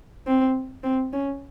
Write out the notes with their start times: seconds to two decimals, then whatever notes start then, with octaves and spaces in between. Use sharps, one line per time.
0.27 C4
0.84 C4
1.13 C#4